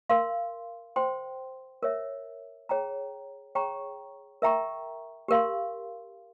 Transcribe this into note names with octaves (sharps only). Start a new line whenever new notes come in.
A#4 F5 C6
C5 G5 C6
A#4 C#5 E5
G#4 C#5 G5 A#5
G#4 C#5 G5 A#5 C#6
A#4 E5 G5 A#5 C#6
G4 A#4 F5 C6